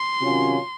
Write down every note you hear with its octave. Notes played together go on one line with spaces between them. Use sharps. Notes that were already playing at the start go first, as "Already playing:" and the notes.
Already playing: C6
C3 D#3 F#3 C#4 F4